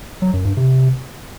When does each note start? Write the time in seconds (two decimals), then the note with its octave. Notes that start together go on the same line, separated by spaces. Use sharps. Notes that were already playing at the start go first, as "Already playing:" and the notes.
0.22 F#3
0.33 F#2
0.45 G2
0.57 C3